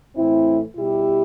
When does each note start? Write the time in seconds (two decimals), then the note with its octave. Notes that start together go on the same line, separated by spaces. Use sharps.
0.15 A2 E3 A3 C4 E4
0.77 B2 G3 B3 E4 G4